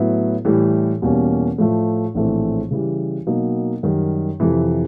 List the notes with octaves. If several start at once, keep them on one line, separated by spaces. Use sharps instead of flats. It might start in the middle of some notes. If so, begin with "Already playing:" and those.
Already playing: A2 F#3 B3 E4
A2 E3 G3
E2 B2 G3 A#3 C#4
A2 F3 A3
A#1 A2 E3 A3 C4
C#3 E3 G3
B2 F#3 A#3 D#4
F#2 D#3 G3
F2 C3 E3